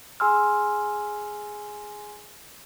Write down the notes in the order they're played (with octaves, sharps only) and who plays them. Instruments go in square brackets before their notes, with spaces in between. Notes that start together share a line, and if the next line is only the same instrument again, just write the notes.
[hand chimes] G#4 G#5 C6 E6 F6